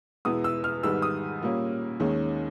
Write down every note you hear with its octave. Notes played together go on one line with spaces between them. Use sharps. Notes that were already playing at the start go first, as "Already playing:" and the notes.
E2 B2 G#3 B3 E4 D#6
E6
F6
G#2 D#3 G3 B3 E6
D#6
A#2 G3 A#3 C#4
D#2 D#3 G#3 C#4